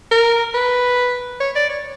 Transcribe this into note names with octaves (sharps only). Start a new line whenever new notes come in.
A#4
B4
C#5
D5
C#5